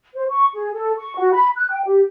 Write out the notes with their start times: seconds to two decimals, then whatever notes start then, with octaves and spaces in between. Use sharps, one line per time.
0.14 C5
0.30 C#6
0.53 G#4
0.73 A4
0.98 C#6
1.17 F#4
1.33 B5
1.56 F#6
1.70 G5
1.85 G4